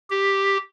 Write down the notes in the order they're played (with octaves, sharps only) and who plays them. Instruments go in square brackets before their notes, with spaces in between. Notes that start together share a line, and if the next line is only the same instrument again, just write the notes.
[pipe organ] G4